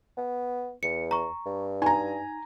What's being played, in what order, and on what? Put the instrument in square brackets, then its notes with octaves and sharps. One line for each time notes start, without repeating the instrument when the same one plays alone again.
[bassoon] B3
[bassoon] E2 [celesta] C#7
[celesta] A#5 C#6
[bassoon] G2
[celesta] D#4 [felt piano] G#5 A#5